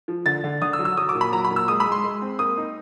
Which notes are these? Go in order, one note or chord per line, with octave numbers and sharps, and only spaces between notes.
F3
D3 A6
D3
D3 D#6
E6
F#3
E6
F#3 D#6
D6
A#2
B5
F#3 A#5
B5
A#2
E6
G#3 D#6
B5
G#3
C6
G#3
C4
A#3 D#6
D#4